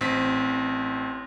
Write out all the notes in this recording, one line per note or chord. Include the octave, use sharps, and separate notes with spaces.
A1 C4 B6